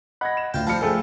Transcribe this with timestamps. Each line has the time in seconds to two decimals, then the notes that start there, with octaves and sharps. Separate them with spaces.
0.21 D#5 F#5 B5 F#6 G#6 A#6
0.37 E7
0.54 D2 F4 G5
0.67 F3 G3 C4 F4 A5 B5 F6 C#7
0.81 C#2 A3 G#4 A4